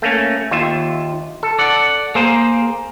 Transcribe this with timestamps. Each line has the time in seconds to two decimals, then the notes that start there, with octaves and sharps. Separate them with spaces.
0.02 A3 A#3 C#4
0.51 D#2 F4 E5
1.43 A4
1.59 D5 F#5
2.15 A#3 G#4 C5